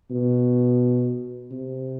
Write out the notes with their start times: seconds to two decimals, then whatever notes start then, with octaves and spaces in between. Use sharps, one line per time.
0.11 B2
1.51 C3